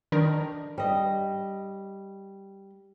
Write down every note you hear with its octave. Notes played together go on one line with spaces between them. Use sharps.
D#3 D4 A#4
G3 D#5